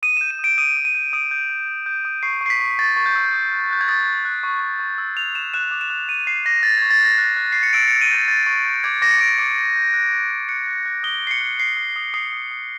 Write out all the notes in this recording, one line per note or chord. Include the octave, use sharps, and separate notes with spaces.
D#6 D#7
G6 E7
D#7
D#6 D7
D#6 D#7
D#6
D#7
G6
D#6 D7
G6
G6
G6
G6
D#6
C#6 C7
C#6 C7
B6
C#6
C#6 A6
C#6
G6
E6
D#6
F#6
F#6 G6
G#6
D#6 A6
F#6
F#6
C#6
C#6
C#6
E6
E6 F7
C#6 E7
F#6 E7
D6
E7
F#6
F#6 D#7
F#6 C7
D6 A#6
F#6 A6
C#6 G#6
A6
F#6 A#6
F#6
F#6
C#6 C7
C#7
E6 D7
E6 C#7
D#7
G6 A6
C#6 A6
C#6
G6
D6 G#6
D6 A#6
C#7
D6 D7
D6 C#7
G6
G6
F#6
F#6
F#6
F#6 C#7
F#6
F#6
D#6 G7
F#6 C7
C#7
F#6
F#6 C7
D#6
D#6
D#6 C7
D#6
D#6